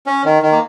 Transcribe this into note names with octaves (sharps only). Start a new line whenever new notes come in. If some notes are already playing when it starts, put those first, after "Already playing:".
C#4
D#3
D#3
A#3